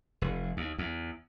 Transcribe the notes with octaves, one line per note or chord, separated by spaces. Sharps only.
F1
D#2
E2